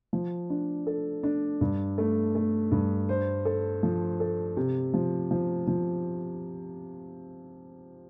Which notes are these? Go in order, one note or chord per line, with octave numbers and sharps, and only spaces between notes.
F3
D4
A4
D4
G2
A3
A3
G2
C5
A4
F3
A4
C3
F3
F3
F3